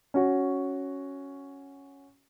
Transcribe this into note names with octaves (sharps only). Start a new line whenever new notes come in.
C#4 F#4